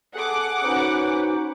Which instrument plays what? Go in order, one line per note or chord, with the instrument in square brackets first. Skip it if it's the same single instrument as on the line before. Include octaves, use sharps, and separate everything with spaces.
[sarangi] G#4 [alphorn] A4 [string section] F#5 D6
[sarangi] C#4 [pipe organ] D#4 F#4 C5 [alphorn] B4